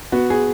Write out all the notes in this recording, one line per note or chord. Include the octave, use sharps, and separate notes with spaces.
B3 F#4
G#4